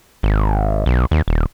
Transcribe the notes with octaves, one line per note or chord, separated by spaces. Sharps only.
G#1
B1
D#2
D#1